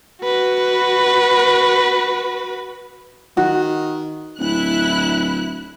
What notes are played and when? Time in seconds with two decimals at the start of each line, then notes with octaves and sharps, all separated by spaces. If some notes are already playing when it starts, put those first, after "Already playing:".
0.23 F#4 B4
3.37 D#3 F#4
4.39 D1 E4 F#6